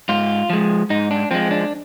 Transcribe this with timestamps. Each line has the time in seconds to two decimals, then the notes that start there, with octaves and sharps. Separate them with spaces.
0.09 G#2 F4
0.50 F3 G#3
0.90 G#2 D#4
1.11 D4
1.31 F3 G#3 C4
1.51 D4